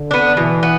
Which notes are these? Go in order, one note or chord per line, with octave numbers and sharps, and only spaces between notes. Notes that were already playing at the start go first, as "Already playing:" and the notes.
Already playing: D3
B3 D4
B2 E3
B3